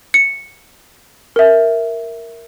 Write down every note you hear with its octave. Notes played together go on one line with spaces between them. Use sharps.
C#7
A#4 E5